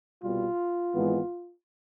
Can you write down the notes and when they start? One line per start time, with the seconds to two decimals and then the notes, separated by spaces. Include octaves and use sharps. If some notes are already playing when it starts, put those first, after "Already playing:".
0.21 C2 B2 G3 F4
0.94 G#1 G#2 E3 G#3 B3